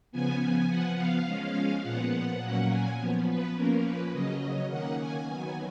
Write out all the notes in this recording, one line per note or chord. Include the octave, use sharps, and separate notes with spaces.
C#3 F3 B3 G#5
F3 B3 F#5
F5
F3 G#3 C#4
A#2 F3 B3 F#5
A#2 F#3 A#3 C#4
G#5
F3 B3
B4
F3 A#3 C#4 A#4
B4
C#3 F#3 C#4 D#5
D#3 A#3 C#4 F#5
G#5
D#3 F#3 B3 G#5